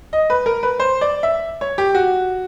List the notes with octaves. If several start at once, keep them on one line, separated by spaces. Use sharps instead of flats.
D#5
B4
A#4
B4
C5
D5
E5
C#5
G4
F#4